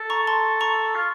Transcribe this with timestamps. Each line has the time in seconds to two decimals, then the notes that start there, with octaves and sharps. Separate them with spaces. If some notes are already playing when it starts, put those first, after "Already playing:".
Already playing: A4
0.10 A#5 C#6
0.27 A5 C6
0.61 A#5 C#6
0.95 F4